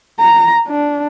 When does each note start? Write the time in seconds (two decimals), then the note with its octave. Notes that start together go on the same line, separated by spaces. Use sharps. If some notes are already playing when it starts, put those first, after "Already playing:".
0.20 A#5
0.67 D4